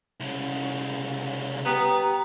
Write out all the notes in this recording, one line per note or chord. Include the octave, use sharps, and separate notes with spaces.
C2 C#3
B3 G4 G5 A#5 D#6